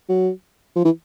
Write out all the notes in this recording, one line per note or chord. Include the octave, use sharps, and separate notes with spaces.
F#3
F3
E3